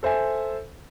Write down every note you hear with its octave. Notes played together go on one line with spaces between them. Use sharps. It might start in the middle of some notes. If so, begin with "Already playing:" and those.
A4 C5 E5 G#5